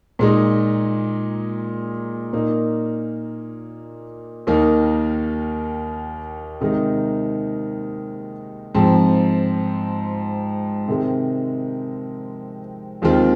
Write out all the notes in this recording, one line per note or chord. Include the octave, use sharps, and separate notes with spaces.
A#2 G#3 D#4
A#2 A#3 D#4
D#2 D#3 A#3 D#4
C3 D#3 G#3 D#4
G#2 F3 C4
C3 D#3 G#3 C4
D#2 D#3 G#3 C4 F4